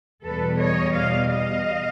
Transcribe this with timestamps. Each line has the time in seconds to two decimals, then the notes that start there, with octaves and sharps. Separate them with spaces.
0.23 E2 B2 G3 A4 B4
0.59 C#5 D#5
0.94 D#5 F5
1.29 D#5 F5